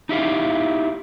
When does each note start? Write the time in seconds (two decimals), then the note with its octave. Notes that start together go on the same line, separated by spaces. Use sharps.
0.09 D#4 E4 G4 F5